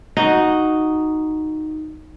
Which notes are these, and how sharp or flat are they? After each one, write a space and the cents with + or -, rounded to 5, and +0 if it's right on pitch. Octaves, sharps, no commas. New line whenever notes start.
D#4 +0 F#4 +0